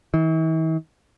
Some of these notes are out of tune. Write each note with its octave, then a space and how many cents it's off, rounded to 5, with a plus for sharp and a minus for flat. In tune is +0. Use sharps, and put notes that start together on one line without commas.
E3 -45